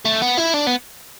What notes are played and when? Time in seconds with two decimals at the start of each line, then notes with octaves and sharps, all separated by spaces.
0.05 A3
0.22 B3
0.37 E4
0.54 D4
0.67 B3